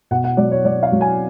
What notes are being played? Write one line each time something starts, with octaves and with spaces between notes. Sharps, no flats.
B2 F#5
F#5
F#3 D5
C#5
F#3 D5
F5
F#3
G#5